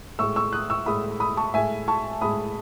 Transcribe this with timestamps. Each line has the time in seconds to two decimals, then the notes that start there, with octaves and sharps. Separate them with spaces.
0.19 A2 G#3 C#6 E6
0.36 C#6 E6
0.53 D#6 F#6
0.70 C#6 E6
0.86 A2 G#3 B5 D#6
1.20 B5 D#6
1.37 A5 C#6
1.54 A2 G#3 E5 G#5
1.88 A5 C#6
2.21 A2 G#3 B5 D#6